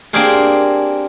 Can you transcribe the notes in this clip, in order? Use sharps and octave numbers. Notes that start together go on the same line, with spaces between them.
A#3 C4 D4 G4 G#4 A#4